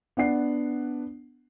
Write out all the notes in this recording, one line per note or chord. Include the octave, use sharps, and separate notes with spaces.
B3 D4 F#5 C7